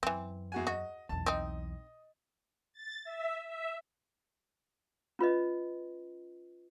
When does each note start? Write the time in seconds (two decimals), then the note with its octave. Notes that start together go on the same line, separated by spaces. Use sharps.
0.03 F#2 E3 C4
0.52 E2 F#4 G#5
0.67 F#4 D#5
1.09 B1 E2 A5
1.26 C4 D#4 D#5
2.73 A6
3.04 E5
3.47 E5
5.19 C#4 F4 B4 D#5